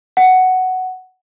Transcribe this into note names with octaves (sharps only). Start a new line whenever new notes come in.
F#5